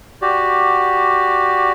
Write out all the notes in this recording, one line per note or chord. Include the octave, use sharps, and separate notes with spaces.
F#4 G4 D5